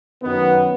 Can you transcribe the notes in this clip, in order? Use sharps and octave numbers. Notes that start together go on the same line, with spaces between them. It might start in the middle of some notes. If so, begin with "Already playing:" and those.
F#2 D#3 B3